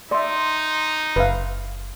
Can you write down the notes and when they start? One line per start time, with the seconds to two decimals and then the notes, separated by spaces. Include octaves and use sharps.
0.11 D#4 D5 E5 C6 D6
1.16 F#1 B4 E5 F5